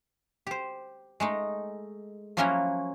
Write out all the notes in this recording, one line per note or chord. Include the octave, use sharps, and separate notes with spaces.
G4 C5
G#3 A3 D#4
F3 F#3 A#3 C#4 E4 F#4